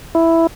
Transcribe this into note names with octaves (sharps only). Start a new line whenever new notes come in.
E4